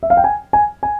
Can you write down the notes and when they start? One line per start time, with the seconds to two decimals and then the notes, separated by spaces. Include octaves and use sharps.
0.03 E5
0.10 F5
0.17 G5
0.24 G#5
0.53 G#5
0.83 G#5